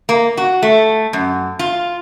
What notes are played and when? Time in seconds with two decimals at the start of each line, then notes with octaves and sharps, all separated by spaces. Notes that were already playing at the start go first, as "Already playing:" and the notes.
0.09 A#3
0.37 F#4
0.62 A3
1.13 F#2
1.59 F4